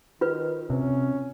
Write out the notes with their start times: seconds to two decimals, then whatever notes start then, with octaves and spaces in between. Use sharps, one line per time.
0.21 D#3 F4 B4
0.70 C3 C#4